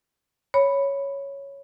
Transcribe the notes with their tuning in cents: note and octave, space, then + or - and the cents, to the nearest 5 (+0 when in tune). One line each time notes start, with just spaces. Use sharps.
C#5 +0 B5 +0